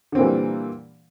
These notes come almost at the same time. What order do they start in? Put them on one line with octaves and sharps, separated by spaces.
D3 C4 A#2 E3 G3